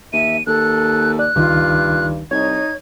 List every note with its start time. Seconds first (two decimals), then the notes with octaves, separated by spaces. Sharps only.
0.13 D#2 E5 D#7
0.47 D#2 A4 F#6
1.19 D5 F#6
1.36 C#2 G2 D#3 D#4 F4
2.31 C2 D#4 C#5 G#6